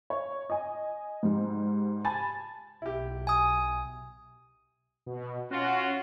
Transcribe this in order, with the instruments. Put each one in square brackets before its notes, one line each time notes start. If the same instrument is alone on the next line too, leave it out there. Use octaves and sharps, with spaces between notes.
[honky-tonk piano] C#5
D#5 G#5
G#2 G3
G#5 A5 B5 A6
[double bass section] B1 [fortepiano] E4 G4
[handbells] G#5 D#6
[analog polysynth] B2
[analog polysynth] C#4 F#5 [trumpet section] F4 F#4